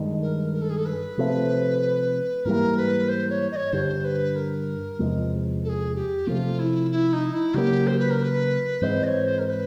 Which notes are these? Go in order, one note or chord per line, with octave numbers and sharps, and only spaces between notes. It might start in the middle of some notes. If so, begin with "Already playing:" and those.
Already playing: G2 D#3 G#3
A#4
A#4
A4
G#4
A4
B4
C3 F3 A3 C4
G#2 E3 G3 A#3 A#4
B4
C5
C#5
D#5
C#5
G2 D3 G3 C5
B4
A#4
E2 C3 F3 G#3
A4
G#4
G4
C3 F3 A3 F4
E4
E4
D#4
E4
C#3 F#3 A#3 G4
C5
B4
A#4
B4
G#2 E3 G#3 C4 C5
D#5
C#5
C5
A#4
C5
B4